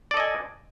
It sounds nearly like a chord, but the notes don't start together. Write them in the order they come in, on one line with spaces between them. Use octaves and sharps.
D5 A4 D#5 G#5